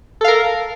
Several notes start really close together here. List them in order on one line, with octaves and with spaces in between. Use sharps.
A4 F5 A#4